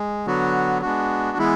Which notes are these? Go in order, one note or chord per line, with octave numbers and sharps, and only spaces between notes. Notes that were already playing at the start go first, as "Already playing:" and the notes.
Already playing: G#3
D3 F#3 B3 F#4
G#3 B3 D4 F#4
E3 G#3 B3 E4